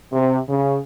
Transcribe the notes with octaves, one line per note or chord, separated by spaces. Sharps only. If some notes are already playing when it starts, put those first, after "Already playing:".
C3
C#3